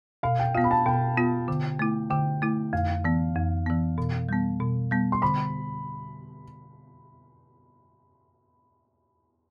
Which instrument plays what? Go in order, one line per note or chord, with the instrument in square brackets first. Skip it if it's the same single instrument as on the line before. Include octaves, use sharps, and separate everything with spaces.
[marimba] B2 [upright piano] F5
[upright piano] G5
[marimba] B3 F4 [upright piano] F5
[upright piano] B5
A5
[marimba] B2 [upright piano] G5
[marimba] B3 F4
D3
A3 E4
[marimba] D3 [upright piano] G5
[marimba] A3 E4
[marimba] F2 [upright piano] F5
[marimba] E3 B3
F2
E3 B3
B2
G3 B3
B2
G3 B3
[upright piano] C6
[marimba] D3 [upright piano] B5